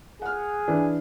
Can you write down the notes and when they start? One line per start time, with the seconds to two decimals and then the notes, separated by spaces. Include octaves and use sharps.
0.22 G#4 F#5 F6
0.68 E3 D4